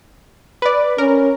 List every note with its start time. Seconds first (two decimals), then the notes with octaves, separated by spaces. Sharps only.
0.62 B4 D5
0.98 C#4 A#4